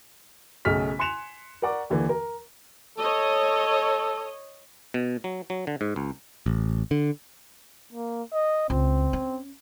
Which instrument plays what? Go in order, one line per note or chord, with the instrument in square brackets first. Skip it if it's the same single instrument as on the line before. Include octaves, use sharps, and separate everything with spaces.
[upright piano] B1 C#3 A3 G#4 F6 B6
G#5 C6 F#6 C#7 E7 F7
A#4 D5 F#5 C#6 D6
D#2 D3 E3 A#3
A#4
[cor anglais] A4 [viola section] C#5 D#5
[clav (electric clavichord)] B2
F#3
F#3
D3
G#2
C#2
[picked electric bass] A1
D3
[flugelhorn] A#3
D#5
[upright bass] C#2 [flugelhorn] C4
[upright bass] C#4